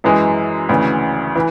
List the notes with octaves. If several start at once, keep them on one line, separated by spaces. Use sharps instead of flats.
F#2 E3 G#3
D2 C#3 E3
E3